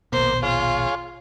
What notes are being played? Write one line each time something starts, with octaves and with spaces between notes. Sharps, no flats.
A#1 D#2 B2 A#3 C5
F4 G#4 C#5 F5